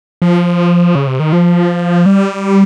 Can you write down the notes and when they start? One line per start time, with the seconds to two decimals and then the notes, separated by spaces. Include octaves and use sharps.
0.22 F3
0.95 C#3
1.07 C3
1.20 D#3
1.33 F3
2.06 G3